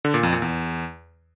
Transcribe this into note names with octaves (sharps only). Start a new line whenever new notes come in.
D3
A#2
F2
A#2
E2